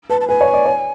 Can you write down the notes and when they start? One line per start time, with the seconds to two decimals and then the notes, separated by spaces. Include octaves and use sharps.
0.10 B4 A5
0.21 A5
0.28 B4 G#5
0.41 C#5
0.53 D5
0.66 C#5